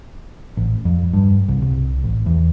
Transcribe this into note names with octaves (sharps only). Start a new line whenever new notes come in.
A1
F2
G2
C2
C2
A1
E2